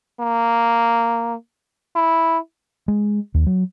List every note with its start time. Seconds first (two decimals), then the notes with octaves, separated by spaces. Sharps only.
0.20 A#3
1.96 E4
2.88 G#3
3.34 D#2
3.47 F#3